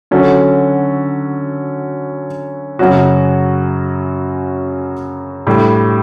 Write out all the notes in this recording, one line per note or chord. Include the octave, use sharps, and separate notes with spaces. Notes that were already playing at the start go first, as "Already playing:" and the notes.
D3 F#3 C#4 F#4 A4
F#2 C#3 F#3 C#4 F#4
A2 G3 D4